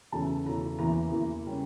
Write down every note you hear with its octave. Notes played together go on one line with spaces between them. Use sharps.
E2 C#3 E3 A3 C#4 A5
E2 C#3 E3 A3 C#4 A#5
E2 E3 A#3 A#5
E2 E3 A#3
C#3 G3 C#4